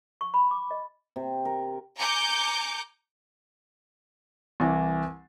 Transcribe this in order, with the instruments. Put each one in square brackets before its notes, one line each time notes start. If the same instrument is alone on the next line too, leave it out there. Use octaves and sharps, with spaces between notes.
[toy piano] C#6
B5
D6
D#5
[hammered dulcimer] C3
A#4
[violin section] G#5 A#5 D6 G6 C#7
[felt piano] C2 E3